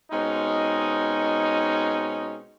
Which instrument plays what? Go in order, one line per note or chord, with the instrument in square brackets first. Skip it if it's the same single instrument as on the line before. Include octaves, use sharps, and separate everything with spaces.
[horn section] B2 G#3 C4 C#4 D#4